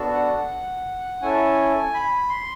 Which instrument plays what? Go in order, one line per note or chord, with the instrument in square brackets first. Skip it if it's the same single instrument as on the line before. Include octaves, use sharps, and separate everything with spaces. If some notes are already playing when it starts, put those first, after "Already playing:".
Already playing: [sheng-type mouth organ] B3 D4 F#4 A4
F#5
C#4 E4 A4 G#5
B5
C6